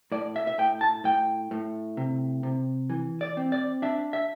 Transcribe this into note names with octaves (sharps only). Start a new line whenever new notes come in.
A2 D5
E5
E5
A2 G5
A5
A2 G5
A2
C3
C3
E3
D5
C4
D5
D4 E5
E5